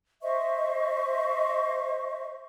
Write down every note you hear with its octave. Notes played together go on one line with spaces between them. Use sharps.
C5 D#5 E5 C#6